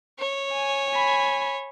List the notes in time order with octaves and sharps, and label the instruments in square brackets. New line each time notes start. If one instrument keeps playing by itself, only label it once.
[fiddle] C#5
[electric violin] G#5
G#5 B5